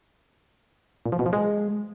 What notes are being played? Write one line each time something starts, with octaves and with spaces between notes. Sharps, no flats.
A#2
F3
B2
F3
G#3